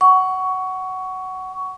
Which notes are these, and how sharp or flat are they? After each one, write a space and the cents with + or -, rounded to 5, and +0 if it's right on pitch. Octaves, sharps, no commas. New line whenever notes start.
F#5 +15 C#6 +15